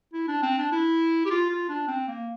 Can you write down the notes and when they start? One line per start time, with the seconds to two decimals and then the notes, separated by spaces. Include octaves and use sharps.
0.13 E4
0.28 D4
0.42 C4
0.58 D4
0.72 E4
1.26 G4
1.30 F4
1.49 F4
1.69 D4
1.88 C4
2.08 A#3